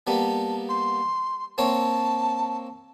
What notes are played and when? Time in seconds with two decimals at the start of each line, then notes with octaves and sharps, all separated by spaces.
0.07 G3 A#3 B3 A5
0.69 C6
1.58 A#3 C4 C#5 A5